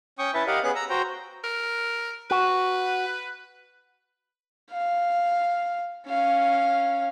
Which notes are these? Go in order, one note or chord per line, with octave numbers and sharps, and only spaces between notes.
C#4 G5 C#6 D#6
C#4 E4 B4 E5 A5
G4 A#4 D#5 F5 F#5
B3 C#4 G#4 B4 F#6
A#5 E6
F#4 C5 G5 A#5
A#4
F#4 B4
F5
C#4 F5